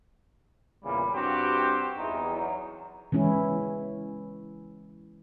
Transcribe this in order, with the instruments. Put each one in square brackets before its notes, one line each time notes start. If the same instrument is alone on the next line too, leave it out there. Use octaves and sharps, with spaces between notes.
[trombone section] E2 A#2 C#3 [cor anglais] G3
[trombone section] G2 F#4 G4 [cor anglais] C4
[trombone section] E2 [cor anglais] D#4
[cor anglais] F#3
[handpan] E3 G#3 C#4 E4